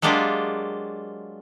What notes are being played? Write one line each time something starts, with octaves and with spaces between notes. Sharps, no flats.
F#3 G#3 A#3 D4 F4 G4